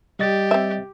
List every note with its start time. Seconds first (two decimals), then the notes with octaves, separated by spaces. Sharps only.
0.19 G3 G4 D#5 A6
0.51 C4 E5